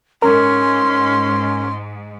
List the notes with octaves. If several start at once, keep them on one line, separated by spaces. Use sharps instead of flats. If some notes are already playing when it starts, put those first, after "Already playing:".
G#2 C#4 A#4 C6